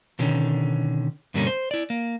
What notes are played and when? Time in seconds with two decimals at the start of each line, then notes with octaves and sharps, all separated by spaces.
0.19 B2 D3 D#3 C#4
1.34 G2 B2 D3 G3 A#3 C#4
1.47 C5
1.71 E4 D5
1.90 A#3